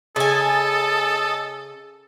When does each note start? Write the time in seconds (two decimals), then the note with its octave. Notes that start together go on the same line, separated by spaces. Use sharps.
0.16 C#3 A4 D#5 G#5 A5